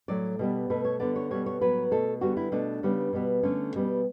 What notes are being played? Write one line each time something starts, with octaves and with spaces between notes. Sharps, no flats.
A2 F#3 A3 D5
B2 G3 B3
B2 A3 B4
C#5
D3 G3 B3 D5
C#5
B2 G3 B3 C#5
C#5
A2 F#3 B3 B4
B2 A3 A4
D3 G3 B3 F#4
E4
B2 A3 D4
C#3 G3 B3
B2 G3 B3
D3 A3 C#4
B2 G3 B3